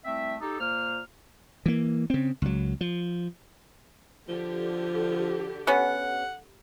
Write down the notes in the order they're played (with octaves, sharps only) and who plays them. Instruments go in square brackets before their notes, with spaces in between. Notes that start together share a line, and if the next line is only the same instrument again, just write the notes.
[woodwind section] C2 A3 C4 E5
D#4 G4 A4
A#2 A#3 C5 F6
[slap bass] E3 A#3
C#3 C4
C#2 F#3
F3
[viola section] D3 G4 [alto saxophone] F3
[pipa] B3 C#4 [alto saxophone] F#5